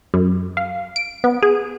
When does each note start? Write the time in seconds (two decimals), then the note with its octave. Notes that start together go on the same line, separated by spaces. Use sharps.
0.14 F#2
0.57 F5
0.96 D7
1.24 B3
1.43 G#4